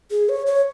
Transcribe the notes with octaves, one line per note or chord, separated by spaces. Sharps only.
G#4
C#5
C#5